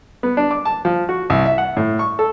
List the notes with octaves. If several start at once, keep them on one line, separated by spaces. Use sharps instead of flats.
B3
D4
D6
A5
F3
F#4
C2
E5
F#5
A2
C#6
A4